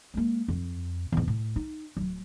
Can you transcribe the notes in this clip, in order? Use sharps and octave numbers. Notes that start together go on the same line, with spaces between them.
G#3 A#3
F2
E2 G#2
A2
D#4
D1 F#3